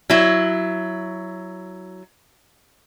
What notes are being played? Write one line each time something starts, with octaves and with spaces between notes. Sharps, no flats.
F#3 E4